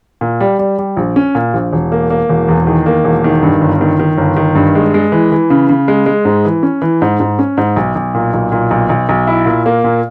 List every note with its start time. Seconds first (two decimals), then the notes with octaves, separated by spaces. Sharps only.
0.21 A#2
0.40 G3
0.59 G3
0.79 G3
0.97 A#1
1.16 C#4
1.35 A#2
1.54 A#1
1.72 E1
1.92 A#3
2.10 A#3
2.29 E1
2.48 E2
2.67 D#3
2.86 A#3
3.04 E1
3.24 D#3
3.43 G2
3.61 G1
3.81 D#3
3.99 D#3
4.18 G1
4.36 D#3
4.55 G2
4.75 G#3
4.94 G#3
5.12 E3
5.32 E3
5.50 C#3
5.69 C#3
5.88 G#3
6.06 G#3
6.25 G#2
6.45 E3
6.63 C#4
6.82 E3
7.02 G#2
7.20 G#2
7.39 C#4
7.57 G#2
7.76 B1
7.95 B1
8.15 A#2
8.33 B1
8.52 A#2
8.71 B1
8.89 B1
9.09 B1
9.27 E4
9.46 A#2
9.66 A#3
9.84 A#2